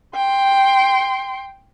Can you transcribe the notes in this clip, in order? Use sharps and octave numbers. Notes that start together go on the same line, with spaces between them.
G5 C6